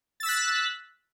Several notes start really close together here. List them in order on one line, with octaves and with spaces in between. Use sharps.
A6 E6 B6 F#6